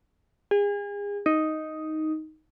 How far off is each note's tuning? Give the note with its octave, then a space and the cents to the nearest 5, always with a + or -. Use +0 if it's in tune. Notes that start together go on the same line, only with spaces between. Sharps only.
G#4 -35
D#4 +5